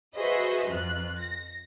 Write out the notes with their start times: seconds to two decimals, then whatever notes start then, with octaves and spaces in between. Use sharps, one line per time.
0.15 F#4 G#4 B4 C5 D#5 E5
0.69 F2 F4 F#6
1.20 A#6